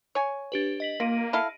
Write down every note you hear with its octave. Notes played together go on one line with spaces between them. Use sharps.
C#5 G#5
D4 G4 B4
D#5 B6 F#7
A#3 F4 A#6 D7 D#7
E4 A4 F5